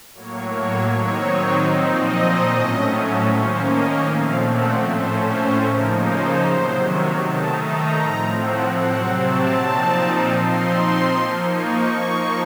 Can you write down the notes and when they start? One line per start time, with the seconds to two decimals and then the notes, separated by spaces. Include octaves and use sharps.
0.14 A2 F#3 A#3 C#5
0.53 C#5
0.93 D#3 F#3 C4 D#4 C#5
1.71 A#2 F3 C4 D#4 D#5
2.50 A2 F#3 A3 C#4
3.28 D#3 A#3 C#4 C5
3.67 D#5
4.06 A#2 F3 A3 C4 F5
4.46 F#5
4.85 A2 A3 C#4 C5
5.24 C5
5.63 C#3 F3 A#3 D#4 A#4
6.03 C5
6.42 C3 D#3 F#3 C5
6.81 C#5
7.20 D#3 A3 D#4 A5
7.60 A#5
7.99 A2 F3 C4
8.39 F#5
8.77 C3 F#3 C4 F#5
9.16 A5
9.56 A#2 F3 C4 D#4
10.35 F3 C4 D#4 C6
11.13 F3 A#3 D#4
11.52 C#6
11.92 F3 A#3 D#4